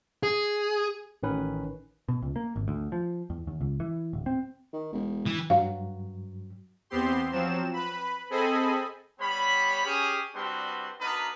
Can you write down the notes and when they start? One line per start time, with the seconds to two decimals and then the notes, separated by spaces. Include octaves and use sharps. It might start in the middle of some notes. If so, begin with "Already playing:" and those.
0.23 G#4
1.23 A1 D#3 C#4 B4
2.09 B2
2.22 C#2
2.36 A#3
2.56 G#1
2.68 D2
2.92 F3
3.30 E2
3.47 D#2
3.61 C#2
3.80 E3
4.13 D1
4.26 C4
4.73 D#3
4.93 E1
5.26 E3
5.50 G2 F#3 F5
6.90 E2 B3 C4 G4 C6
7.32 F3 F#3 C4 E7
7.73 B4 B5
8.30 C4 G#4 A4 D#5 G#5 B5
9.20 G3 B3 C#5 B5
9.85 C#4 G4 G#4
10.35 G3 C4 D4 F#4 B4 C6
11.00 B3 D4 D#4 F#4 A#4 B4